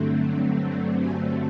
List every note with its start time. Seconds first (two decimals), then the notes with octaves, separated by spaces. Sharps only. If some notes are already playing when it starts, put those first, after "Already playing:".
Already playing: G2 D3 F#3 A3 C4
1.00 G#5